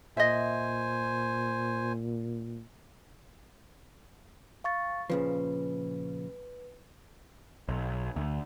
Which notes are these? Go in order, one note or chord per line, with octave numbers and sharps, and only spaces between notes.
A#2 C5 D#5 E5 G#5
F5 C#6 A6
A#2 C#3 F3 B4
B1
D2